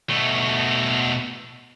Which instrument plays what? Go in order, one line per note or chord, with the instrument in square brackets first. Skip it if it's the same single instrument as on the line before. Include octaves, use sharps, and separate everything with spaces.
[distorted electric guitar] B2 A3